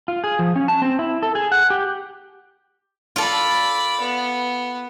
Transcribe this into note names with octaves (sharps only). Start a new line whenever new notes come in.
F4
G#4
F3
C#4
A5
C4
E4
A4
G#4
F#5
G4
F4 A4 D5 B5
B3